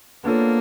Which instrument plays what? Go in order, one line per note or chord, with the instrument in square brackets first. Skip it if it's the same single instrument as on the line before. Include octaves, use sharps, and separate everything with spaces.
[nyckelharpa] A#3 [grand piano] B3 D4 F4 A4 C#5